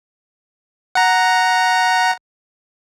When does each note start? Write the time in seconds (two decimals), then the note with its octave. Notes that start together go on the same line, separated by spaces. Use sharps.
0.95 F#5 A#5